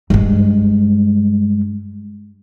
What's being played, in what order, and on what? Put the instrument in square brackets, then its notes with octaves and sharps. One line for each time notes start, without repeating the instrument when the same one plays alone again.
[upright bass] G2 G#3